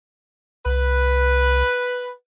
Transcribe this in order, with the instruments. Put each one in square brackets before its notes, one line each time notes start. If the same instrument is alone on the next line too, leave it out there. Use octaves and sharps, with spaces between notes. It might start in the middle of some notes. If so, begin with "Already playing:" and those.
[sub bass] C2 [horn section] B4